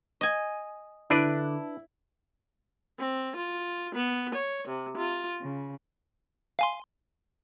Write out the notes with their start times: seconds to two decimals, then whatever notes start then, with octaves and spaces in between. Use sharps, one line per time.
0.21 D#5 G#5
1.10 D3 D4 E4 B4 D5
2.98 C4
3.35 F4
3.94 B3
4.34 C#5
4.67 C3
4.97 F4
5.41 C#3
6.59 F5 G#5 C6